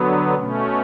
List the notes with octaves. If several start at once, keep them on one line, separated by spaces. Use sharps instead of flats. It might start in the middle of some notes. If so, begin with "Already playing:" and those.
Already playing: D3 F#3 B3
B2 A3 C#4